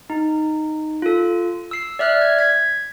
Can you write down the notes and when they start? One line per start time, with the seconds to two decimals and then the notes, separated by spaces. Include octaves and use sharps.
0.10 D#4
1.02 F4 A4
1.71 E6 C7
1.99 D5 E5 F6 F#6
2.21 G#6
2.39 G#6 B6